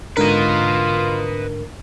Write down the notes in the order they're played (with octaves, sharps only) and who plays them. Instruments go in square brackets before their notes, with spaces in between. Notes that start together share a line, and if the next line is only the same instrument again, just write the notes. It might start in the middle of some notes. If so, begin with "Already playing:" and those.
[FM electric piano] G#2 D3 A#4 [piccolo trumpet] F4 [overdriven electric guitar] B4 D#5